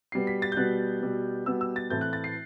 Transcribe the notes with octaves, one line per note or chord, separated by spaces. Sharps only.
B2 G3 B3 C7
B6
A6
G6
B2 G3 B3 F#6
B2 G3 B3
B2 G3 B3 E6
E6
A6
A2 E3 A3 C4 G6
F#6
A6
C7